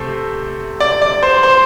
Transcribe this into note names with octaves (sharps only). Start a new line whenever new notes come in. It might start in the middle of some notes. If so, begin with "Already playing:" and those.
Already playing: C3 A3 C4 A4
D5
D5
C5
C5